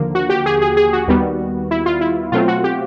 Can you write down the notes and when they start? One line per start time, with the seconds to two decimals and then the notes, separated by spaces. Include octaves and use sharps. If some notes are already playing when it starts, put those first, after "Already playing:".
Already playing: D#2 D3 F3 A#3
0.15 F#4
0.29 G4
0.46 G#4
0.62 G#4
0.77 G#4
0.93 F#4
1.08 D#2 D#3 G3 B3
1.71 E4
1.86 F4
2.01 E4
2.32 B2 F#3 A3 C4 F4
2.48 F#4
2.64 G4